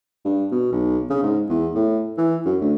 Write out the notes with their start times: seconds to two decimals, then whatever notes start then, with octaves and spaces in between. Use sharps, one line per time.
0.25 G2
0.51 B2
0.72 B1
1.10 C#3
1.23 G#2
1.49 E2
1.75 A2
2.18 E3
2.45 F#2
2.61 D2